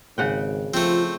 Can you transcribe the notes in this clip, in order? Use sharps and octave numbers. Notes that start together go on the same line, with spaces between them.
G#1 C#3 F#5 G5
F3 A3 C4 F4 G5